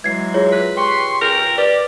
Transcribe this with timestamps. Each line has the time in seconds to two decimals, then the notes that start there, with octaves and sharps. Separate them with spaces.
0.04 E3 F#3 G#3 G#6 C7
0.34 F4 G#4 C#5
0.52 B4
0.77 G4 C6 C#6
1.21 C#2 A#4 G5
1.58 G4 B4 D5